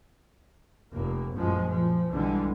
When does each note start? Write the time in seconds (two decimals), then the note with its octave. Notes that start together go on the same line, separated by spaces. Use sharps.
0.92 F1 A#3
1.33 A1 F#2 A#2 F3 G#3
1.71 A#2 F3
2.10 B1 D3 E3 G3 G#3